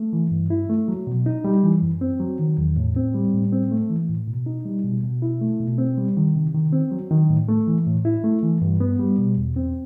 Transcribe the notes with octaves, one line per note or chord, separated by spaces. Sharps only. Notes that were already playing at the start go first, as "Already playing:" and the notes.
Already playing: A3
E3
G2
E4
A3
F#3
B2
D#4
G3
E3
F#2
C4
F#3
D#3
E2
A2
C4
G3
A2
C4
A3
E3
A2
B2
D#4
G3
B2
B2
E4
A3
B2
C4
G3
D#3
C3
D#3
C4
F#3
D#3
A2
A3
E3
A2
E4
A3
E3
G2
B3
G3
B2
E2
C4